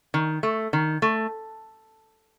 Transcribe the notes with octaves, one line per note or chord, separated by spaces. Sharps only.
D#3
A3
D#3
A3